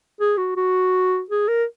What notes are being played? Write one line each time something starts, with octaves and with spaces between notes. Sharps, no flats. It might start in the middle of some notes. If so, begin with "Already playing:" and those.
G#4
F#4
F#4
G#4
A#4